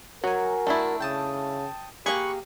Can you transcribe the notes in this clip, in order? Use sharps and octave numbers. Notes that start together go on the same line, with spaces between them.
F#3 F#4 A#4 G#5
A3 D4 E4
C#3 G5 A5 D#6
A#3 G4 G#4 B5 C#6 F#6